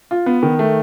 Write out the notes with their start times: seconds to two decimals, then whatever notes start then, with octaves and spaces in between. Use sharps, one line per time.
0.11 F4
0.26 B3
0.43 D#3
0.59 A3